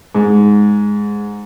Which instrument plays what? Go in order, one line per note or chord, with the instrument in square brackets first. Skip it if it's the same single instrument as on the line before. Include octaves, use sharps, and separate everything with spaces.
[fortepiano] G#2